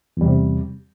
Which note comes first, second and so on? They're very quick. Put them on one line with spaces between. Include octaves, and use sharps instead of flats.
E2 G3 C3